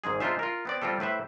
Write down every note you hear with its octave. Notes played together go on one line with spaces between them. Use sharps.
G#1 G#2 G#3 G#4
G#3 D4 D#4 F4 C5 E5
F4 A#4
B3 C4 D5
G3 C4 F4 G4 A4
A2 B4 C5 E5